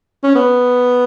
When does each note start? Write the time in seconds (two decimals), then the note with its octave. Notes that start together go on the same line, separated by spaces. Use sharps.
0.23 C#4
0.35 B3